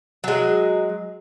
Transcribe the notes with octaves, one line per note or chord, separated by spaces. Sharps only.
F#3 G#3